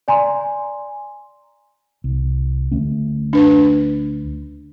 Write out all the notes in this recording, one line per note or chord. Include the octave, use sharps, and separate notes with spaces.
D5 G#5 A#5 C6
C2
D2 A3 C#4
D4 B4